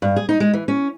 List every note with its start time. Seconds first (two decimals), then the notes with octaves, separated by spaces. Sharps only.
0.02 G2
0.16 G#4
0.29 D#4
0.40 G#3
0.53 E3
0.68 C#4